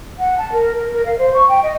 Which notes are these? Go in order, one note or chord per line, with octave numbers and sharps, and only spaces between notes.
F#5
A5
A#4
A#4
A#4
F5
C5
C#6
G5
D#5